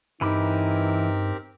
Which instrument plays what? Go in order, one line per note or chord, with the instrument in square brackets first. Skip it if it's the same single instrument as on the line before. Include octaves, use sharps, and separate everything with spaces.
[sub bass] G2 [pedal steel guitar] E3 B5 D6 [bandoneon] C4 G4 A#4 [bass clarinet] D#4